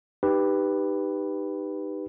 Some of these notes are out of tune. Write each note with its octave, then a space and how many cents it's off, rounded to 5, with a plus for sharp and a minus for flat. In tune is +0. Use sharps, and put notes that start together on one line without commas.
D#4 -15 G4 +0 B4 +0